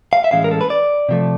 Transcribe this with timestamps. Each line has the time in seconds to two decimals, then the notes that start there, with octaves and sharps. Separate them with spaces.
0.13 F5
0.24 E5
0.31 A2 E3 G#3 C#4 F5
0.44 A#4
0.51 A4
0.61 B4
0.70 D5
1.09 C3 F3 A3